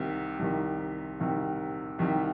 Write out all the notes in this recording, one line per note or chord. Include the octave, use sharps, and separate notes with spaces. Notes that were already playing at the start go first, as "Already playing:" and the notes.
Already playing: C2 C3 D#3
C2 C3 D#3
C2 C3 D#3
C2 C3 D#3